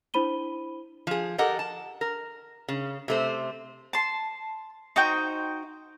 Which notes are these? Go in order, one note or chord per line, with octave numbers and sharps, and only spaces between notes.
D4 E4 C5 B5 D#7 G7
F3 G#4
G4 A4 A#4 D#5 F#5
A5
A#4
C#3
C3 A3 C5
A5 C6
D#4 F#4 C5 G5